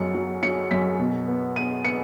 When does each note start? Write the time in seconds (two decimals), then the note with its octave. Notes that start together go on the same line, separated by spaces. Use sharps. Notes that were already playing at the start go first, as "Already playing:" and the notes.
Already playing: F#2 F#3 C#7
0.15 F#3
0.43 F#3 C#7
0.71 F#2 B6
0.99 B2
1.28 B3
1.56 B3 D#7
1.84 B3 C#7